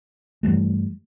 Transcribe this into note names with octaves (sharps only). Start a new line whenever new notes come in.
G2 E3 G3 A3